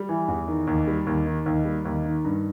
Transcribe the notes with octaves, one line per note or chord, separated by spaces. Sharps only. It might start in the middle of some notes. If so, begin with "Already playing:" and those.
Already playing: G3
E3
E2
D#3
D#2
G3
D#2
D#3
D#2
G3
D#2
D#3
G2